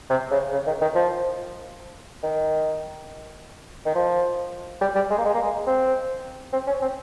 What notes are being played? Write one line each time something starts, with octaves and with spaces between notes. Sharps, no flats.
C3
C#3
C#3
D#3
D#3
F3
D#3
D#3
F3
G3
G3
G#3
A#3
G#3
A#3
G#3
C4
C4
C#4
C4